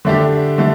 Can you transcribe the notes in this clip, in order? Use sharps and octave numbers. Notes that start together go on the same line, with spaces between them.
D3 A3 D4 G4
D3 A3